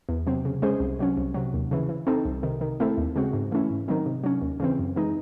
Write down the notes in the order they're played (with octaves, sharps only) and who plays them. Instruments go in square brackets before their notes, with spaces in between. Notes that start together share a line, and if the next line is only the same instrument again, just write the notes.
[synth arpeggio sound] E2
C3 F#3 C4
C#3
G#3 C#4 G#4 C5
C2
C3 F#3 C#4
C2
C3 F#3
D#2
C#3 E3
E3
C4 D#4 A4
C2
C3 D#3
D#3
A3 C4 E4 A4
D#2
C#3 G#3 C4 F#4
G#2
E3 A3 C#4 E4
G#2
D#3 F#3 C4 D#4
C3
F#3 C#4
D#2
C#3 E3 C4
F#2
E3 G#3 D#4